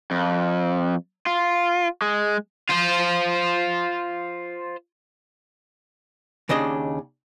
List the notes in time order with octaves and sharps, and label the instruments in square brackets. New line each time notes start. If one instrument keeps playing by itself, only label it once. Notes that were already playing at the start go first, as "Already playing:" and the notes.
[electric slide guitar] F2
F4
G#3
[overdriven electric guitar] F4 C5
[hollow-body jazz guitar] D#2 C#3 D4 D#5